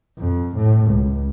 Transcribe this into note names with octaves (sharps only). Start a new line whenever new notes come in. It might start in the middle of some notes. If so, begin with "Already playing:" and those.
F2
A2
C#2